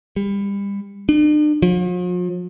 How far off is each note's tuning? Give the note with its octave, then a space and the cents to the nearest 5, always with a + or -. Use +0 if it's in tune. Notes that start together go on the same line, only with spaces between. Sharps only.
G3 +30
D4 +45
F3 +45